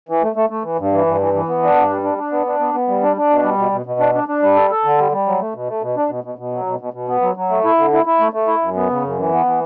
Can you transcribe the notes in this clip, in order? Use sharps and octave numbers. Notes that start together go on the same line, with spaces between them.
E3
A3
A3
A3
E3
G2
E3
G2
E3
E3
B3
D4
G2
G3
D4
D4
B3
D4
B3
B3
G3
D4
D4
B2
G3
B2
B2
B2
D4
D4
D4
G3
A4
A4
D3
G3
G3
F#3
A3
B2
A3
B2
D4
B2
B2
B2
F#3
B2
B2
B2
B3
F#3
F#3
A3
E4
D3
E4
E4
A3
A3
E4
F#2
B3
C#3
F#2
E3
B3
E3